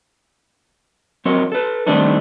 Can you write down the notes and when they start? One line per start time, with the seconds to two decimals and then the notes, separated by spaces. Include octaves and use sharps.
1.25 F#3 C4 A#4 C#5 D#5
1.52 A4 B4
1.87 D#3 G3 A3 C4 D4 D#4